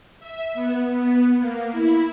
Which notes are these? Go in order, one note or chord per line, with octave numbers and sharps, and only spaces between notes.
E5
B3
B3
A#3
E4